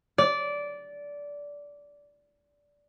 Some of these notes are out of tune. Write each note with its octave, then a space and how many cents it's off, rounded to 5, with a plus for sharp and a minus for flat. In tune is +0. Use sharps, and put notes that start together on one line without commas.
D5 -15